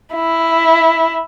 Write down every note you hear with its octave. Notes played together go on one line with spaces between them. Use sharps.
E4